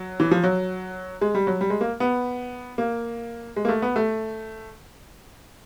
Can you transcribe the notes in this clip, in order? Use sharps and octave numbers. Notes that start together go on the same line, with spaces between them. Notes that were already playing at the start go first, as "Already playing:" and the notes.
Already playing: F#3
E3
F3
F#3
G#3
G3
F#3
G3
G#3
A#3
B3
A#3
G#3
A#3
A3
B3
A3